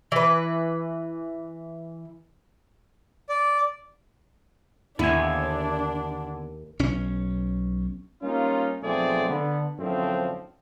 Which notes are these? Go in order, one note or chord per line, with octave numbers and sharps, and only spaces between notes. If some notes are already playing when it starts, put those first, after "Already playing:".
E3 B4
D5
D#2 D3 B3 D4 E4 G#5
B1 C#4
G3 A#3 C#4 D#4 F4
B1 F3 A3 C4 G#4 D5
D3 B3
F#2 A2 D3 F3 C4